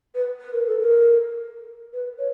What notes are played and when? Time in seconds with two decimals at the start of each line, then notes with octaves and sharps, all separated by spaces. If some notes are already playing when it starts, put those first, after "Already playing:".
0.15 B4
0.40 B4
0.53 A#4
0.67 A4
0.80 A#4
1.93 B4
2.18 C#5